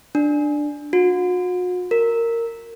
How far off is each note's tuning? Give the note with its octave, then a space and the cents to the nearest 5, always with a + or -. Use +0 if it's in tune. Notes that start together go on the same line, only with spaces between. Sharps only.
D4 +10
F#4 -40
A#4 -15